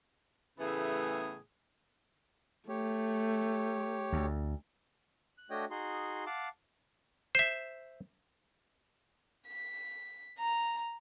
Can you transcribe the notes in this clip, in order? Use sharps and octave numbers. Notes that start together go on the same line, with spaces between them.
A2 C#3 E3 A3 B3 G#4
A3 G4 C#5
D2
F#6
A3 D4 F#4 C#5 D#5 G5
D#4 F#4 G#4 C6
F5 F#5 A5 D6
C5 E5
B6
A#5